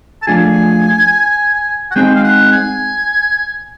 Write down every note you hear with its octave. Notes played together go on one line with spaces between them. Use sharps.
A5
F3 A3 D4 F4 G#4 G#5
F#5
G#3 C4 D#4 G#4 G5
F5
F#5
G#5